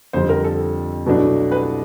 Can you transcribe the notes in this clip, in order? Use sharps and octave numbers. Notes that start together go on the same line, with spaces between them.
F2 D3 G3 C5
A#4
A4
C2 B2 F#3 A3 D4
B4